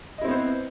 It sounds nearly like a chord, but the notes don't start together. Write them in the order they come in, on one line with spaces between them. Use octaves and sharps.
D#5 E4 C4 B3 C5